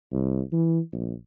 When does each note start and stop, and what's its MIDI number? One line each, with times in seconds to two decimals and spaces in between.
0.12 0.41 36
0.52 0.79 52
0.92 1.13 34